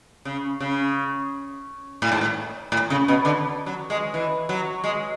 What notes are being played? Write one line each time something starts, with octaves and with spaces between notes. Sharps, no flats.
C#3
C#3
A2
G#2
A2
A2
C#3
B2
D3
F#3
G#3
E3
F#3
G#3